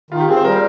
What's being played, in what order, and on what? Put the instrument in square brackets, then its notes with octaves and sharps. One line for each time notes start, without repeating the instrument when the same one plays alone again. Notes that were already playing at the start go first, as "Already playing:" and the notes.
[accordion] D#3 [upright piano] F4
[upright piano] G4
[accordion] C4 [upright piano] G#4
[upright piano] C5
[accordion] G3 [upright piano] A#4